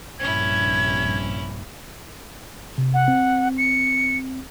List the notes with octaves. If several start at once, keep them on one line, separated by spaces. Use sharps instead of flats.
A#1 G2 C3 C#4 E4 G#6
C3
F#5
C4
C#7